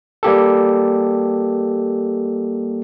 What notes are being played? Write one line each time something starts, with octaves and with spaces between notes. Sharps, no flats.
G3 A#3 G4 A4